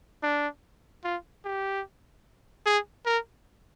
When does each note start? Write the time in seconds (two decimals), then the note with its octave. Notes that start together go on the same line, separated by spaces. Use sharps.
0.23 D4
1.04 F4
1.45 G4
2.66 G#4
3.06 A#4